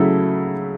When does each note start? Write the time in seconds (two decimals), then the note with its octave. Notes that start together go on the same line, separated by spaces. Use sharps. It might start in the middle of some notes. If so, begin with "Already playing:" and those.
Already playing: C#3 F#3 A3 E4 A4